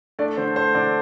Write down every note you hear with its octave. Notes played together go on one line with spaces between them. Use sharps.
A3 D4 D5
D3 C5
A3 C5
D3 D4 D5